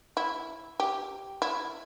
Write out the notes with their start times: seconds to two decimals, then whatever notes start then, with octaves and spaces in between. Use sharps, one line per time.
0.17 E4
0.80 G4
1.42 E4